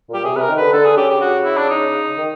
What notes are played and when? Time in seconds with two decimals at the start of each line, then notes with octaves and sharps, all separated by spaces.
0.09 A#2 G4
0.25 C3 G#4
0.36 C3 A#4 B4
0.49 D#3
0.57 D3 B4
0.73 D3 A4
0.85 G#4
0.97 C#3 G4
1.09 G4
1.21 F#4
1.45 E4
1.57 D4
1.70 D#4
2.17 D#3